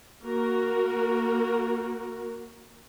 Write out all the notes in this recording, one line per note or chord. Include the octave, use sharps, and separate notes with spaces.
A#3 F#4 A#4